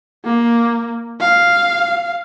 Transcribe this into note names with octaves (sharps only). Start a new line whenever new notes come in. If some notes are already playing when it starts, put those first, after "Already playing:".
A#3
F5